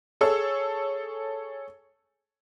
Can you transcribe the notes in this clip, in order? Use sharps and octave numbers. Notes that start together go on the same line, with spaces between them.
G#4 A4 C#5 E6